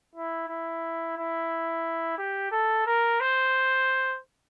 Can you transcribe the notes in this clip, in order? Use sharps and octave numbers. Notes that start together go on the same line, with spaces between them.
E4
E4
E4
G4
A4
A#4
C5